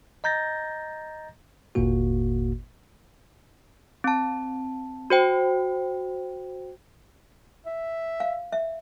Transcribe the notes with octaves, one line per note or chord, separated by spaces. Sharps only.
D#5 A#5 G6 A6 A#6
G1 D#2 A#2 A#3 F#4
C4 A5
F#4 C5 G5
E5
F5
E5